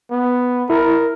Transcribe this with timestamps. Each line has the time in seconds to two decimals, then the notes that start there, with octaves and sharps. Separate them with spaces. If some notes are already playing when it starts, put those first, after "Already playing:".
0.11 B3
0.70 E4 A#4